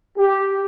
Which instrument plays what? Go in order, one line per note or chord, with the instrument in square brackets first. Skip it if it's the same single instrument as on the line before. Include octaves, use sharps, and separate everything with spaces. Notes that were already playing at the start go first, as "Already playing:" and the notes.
[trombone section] G4